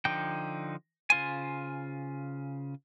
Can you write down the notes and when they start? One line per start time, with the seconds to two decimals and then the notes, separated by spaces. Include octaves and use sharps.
0.05 D3 F3 D#4 G5
1.10 C#3 F4 C5 G#5